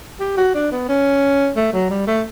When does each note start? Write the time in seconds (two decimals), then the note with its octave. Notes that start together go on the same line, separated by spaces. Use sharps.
0.20 G4
0.37 F#4
0.55 D4
0.71 B3
0.89 C#4
1.56 A3
1.73 F#3
1.90 G3
2.07 A3